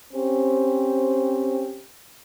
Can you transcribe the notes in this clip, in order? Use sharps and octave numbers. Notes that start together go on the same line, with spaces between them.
C4 C#4 G4 C5